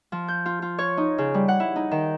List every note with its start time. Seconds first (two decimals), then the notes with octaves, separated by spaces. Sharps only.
0.12 F3
0.28 G6
0.46 F4
0.62 F4
0.79 C#5
0.97 D#4
1.18 C#3
1.34 G3
1.48 F#5
1.60 E4
1.76 D#4
1.91 D#3